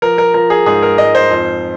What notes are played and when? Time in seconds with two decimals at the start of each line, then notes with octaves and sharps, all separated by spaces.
0.02 F3 A#4
0.18 A#4
0.34 F3 A#4
0.50 G#4
0.66 G#2 G#4
0.83 A#4
0.98 G#2 D#5
1.15 C5
1.31 F2